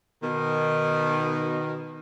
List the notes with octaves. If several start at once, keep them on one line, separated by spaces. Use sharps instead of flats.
B2 D#3